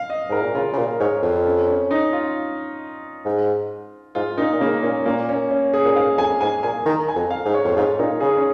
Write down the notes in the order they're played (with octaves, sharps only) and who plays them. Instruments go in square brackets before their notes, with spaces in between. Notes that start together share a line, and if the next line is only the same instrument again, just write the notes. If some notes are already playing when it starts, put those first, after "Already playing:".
Already playing: [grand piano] F5
D#5
[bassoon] G#2 [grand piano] A#4
[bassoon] A#2
[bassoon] C#3 [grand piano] F4
[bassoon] C#3
A#2
[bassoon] G#2 [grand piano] C#5
[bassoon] F2
[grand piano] C#4
C#4
D#4
F4
[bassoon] G#2
[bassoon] G#2 [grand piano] F4
[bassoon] A#2 [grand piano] D#4
[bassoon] A#2
[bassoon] C#3 [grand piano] A#3
[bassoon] A#2 [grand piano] C#4
[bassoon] A#2 [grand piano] A#3
[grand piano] C#4
C#4
G#4
[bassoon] A#2
[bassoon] G#2 [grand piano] F5
[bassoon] F2 [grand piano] G#5
[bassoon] G#2 [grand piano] G#5
[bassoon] A#2 [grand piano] G#5
[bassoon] D#3 [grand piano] A#5
[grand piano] G#5
[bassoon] F2
[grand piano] F5
[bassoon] G#2
[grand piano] C#5
[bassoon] F2
[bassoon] G#2 [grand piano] F4
[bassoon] A#2 [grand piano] D#4
[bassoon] C#3 [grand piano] G#4
[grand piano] C#4